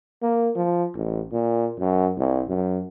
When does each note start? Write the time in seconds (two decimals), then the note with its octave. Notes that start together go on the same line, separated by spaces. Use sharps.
0.22 A#3
0.56 F3
0.95 A1
1.32 A#2
1.79 F#2
2.18 C2
2.48 F#2